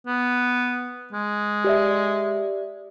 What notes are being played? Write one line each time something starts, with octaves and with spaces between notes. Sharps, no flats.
B3
G#3
G4 D5 E5